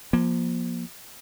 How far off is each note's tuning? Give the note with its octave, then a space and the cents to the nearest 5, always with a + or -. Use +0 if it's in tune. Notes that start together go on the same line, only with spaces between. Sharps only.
F3 +0 A#3 +30